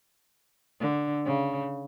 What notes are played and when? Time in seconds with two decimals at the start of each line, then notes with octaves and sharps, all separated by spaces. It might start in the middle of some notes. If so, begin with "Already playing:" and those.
0.80 D3
1.26 C#3